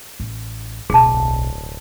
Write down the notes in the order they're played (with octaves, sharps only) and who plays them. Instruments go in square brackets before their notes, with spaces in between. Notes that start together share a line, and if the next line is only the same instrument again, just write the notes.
[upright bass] A1
[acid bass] D1 [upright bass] B1 [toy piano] G#4 A5